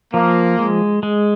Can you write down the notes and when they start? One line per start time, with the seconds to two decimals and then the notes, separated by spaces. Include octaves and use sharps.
0.14 F3 A#3
0.59 G#3
1.03 G#3